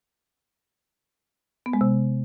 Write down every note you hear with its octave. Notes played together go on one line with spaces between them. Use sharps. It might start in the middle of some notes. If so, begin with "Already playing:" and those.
B3
G#3
C3